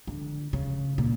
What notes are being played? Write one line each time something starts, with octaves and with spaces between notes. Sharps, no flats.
D3
C#3
A#2